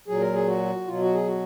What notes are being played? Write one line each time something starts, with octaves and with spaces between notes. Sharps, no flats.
A#2 F#3 G#4
A#4
G#4
F#4
B2 F#3 F4
F#4
G#4
F#4